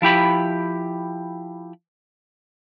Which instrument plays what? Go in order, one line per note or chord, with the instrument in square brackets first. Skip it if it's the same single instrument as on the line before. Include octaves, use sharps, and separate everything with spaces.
[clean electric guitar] F3 E4 G4 B5